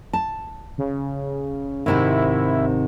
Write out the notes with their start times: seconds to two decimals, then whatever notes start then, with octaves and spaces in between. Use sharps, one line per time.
0.13 A5
0.78 C#3
1.86 G#2 C3 D#3 E4